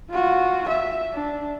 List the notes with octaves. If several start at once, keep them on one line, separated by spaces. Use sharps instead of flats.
F4 F#4
E5
D4